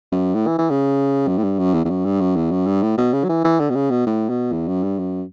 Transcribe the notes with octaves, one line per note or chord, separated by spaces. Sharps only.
F#2
A2
E3
E3
C#3
F#2
A2
G2
F#2
E2
E2
F#2
G2
F#2
E2
F#2
G2
A2
B2
C#3
F#3
E3
E3
D3
B2
C#3
B2
A2
B2
E2
F#2
G2
F#2